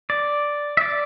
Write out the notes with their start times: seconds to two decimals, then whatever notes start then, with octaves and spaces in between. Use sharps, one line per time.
0.10 D5
0.77 E5
0.81 D5